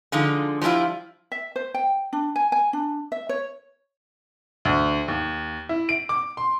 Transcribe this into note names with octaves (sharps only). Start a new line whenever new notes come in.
D3 F3 G#3 D#4
F3 G3 G#3 E4 F4
E5
C5
G5
D4
G#5
G#5
D4
E5
C#5
D2
D#2
E4
D7
D6
C6